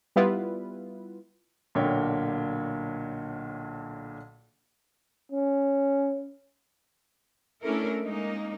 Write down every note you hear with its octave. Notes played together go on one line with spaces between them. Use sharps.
G3 B3 E4 F4 B4
B1 A#2 D3 A#3 C#5 G5
C#4
A3 C#4 D4 E4 A4 A#4
G#3 A#3 C#4 D#4